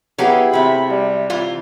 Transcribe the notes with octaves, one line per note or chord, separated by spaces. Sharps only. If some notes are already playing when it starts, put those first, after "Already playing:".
F#3 B3 E4 G4 G#4 F5
C3 A3 B5
G3
E3 F4 A#5